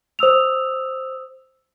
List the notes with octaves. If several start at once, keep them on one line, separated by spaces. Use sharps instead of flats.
C5 D#6 E6 F7